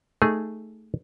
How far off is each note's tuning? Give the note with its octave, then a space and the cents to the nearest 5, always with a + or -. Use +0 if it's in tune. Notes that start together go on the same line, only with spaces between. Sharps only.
A3 +0 D#4 +0 G#4 -5